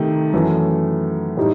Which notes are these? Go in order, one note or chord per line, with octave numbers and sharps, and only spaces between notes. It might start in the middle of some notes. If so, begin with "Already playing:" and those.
Already playing: C3 D#3 A3 D#4
F#2 E3 A3
A2 G3 D#4